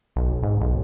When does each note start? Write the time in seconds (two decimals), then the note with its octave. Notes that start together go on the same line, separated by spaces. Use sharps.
0.16 B1
0.43 G#2
0.60 B1